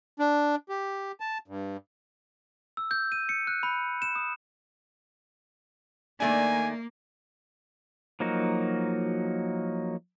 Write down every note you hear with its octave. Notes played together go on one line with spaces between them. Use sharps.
D4
G4
A5
G2
E6
G6
D#7
C#7
F#6
B5
E7
D#6
D#3 A3 A#3 D4 G#5
F3 F#3 A#3 D#4 F#4